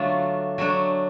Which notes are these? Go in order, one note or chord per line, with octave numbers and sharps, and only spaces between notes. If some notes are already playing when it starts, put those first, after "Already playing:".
Already playing: D3 F#3 A3 D4 F4
F#3 A3 D4